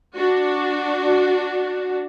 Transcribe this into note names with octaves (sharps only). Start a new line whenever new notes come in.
D4 F#4